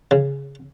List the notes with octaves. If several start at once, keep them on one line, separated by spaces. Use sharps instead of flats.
C#3